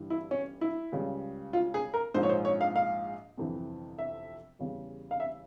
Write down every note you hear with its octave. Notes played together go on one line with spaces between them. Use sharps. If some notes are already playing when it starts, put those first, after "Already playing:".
Already playing: G1 G2 E3 G3
E4
C#4
E4
C#2 C#3 G3
F4
G#4
A#4
A#1 G#2 F3 C5
C#5
C5
C#5
F5
F5
G1 F2 C3 E3
E5
E2 C#3 G3
F5
E5